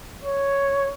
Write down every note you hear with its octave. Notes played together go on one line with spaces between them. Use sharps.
C#5